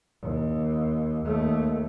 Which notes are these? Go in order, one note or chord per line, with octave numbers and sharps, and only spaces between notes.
D#2
D#2 A3